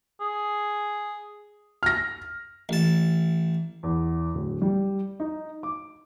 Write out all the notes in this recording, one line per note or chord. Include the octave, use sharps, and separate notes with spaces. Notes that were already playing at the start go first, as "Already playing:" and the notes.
G#4
F6 A#6
A1 A5
E2
D1
G3
D#4
D6